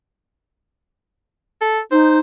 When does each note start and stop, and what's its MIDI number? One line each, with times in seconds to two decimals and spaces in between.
1.61 1.80 69
1.91 2.19 63
1.91 2.19 72